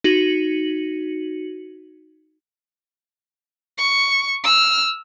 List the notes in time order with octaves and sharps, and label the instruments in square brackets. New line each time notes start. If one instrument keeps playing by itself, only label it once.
[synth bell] D#4 F#4 C#7 F#7
[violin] C#6
E6 F6